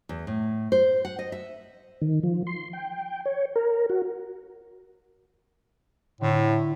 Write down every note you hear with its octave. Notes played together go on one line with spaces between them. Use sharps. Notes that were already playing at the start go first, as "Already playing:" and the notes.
E2
A2
C5
F#5
D#5
E5
D#3
F3
C6
G5
C#5
A#4
F#4
A2 D3 E4